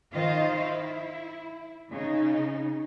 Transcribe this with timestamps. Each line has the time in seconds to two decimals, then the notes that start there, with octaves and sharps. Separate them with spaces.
0.13 D#3 F4 C5 D#5 F5
0.57 E4
1.90 C#3 D#4